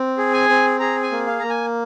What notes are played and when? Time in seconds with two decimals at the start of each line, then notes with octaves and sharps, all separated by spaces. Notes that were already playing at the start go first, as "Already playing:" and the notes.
Already playing: C4
0.18 G#4
0.33 G#5
0.50 C4
0.80 G#4 A#5
1.03 G#5
1.12 A#3
1.27 F5
1.40 A#3 A#5
1.50 G#5